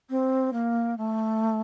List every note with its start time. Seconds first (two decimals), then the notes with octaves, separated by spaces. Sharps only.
0.10 C4
0.53 A#3
0.98 A3